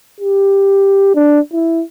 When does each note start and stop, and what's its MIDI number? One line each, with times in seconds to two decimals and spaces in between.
0.21 1.15 67
1.15 1.40 62
1.53 1.83 64